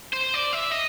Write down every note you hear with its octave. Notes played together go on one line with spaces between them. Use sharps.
C5
D5
E5
D#5